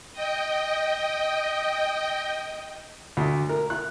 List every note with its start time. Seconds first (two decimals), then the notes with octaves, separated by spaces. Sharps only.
0.13 D#5 G5
3.17 D2
3.49 A#4
3.70 F#6